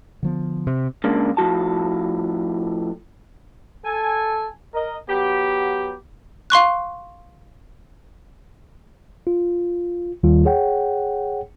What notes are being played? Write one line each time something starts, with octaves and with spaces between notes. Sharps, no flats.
D3 F3 B3
C3
C#3 G#3 A#3 D4
A2 F3 F#4 A5
A4 G#5
A#4 D#5
F#3 B3 G4
F5 C6 C#6 F#6
F4
D#2 D#3 G3 F4
G#4 C#5 F#5 G5